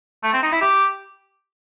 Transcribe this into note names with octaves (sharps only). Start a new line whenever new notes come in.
A3
C4
D#4
E4
G4